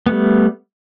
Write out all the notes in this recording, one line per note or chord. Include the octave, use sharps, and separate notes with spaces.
G3 A3 B3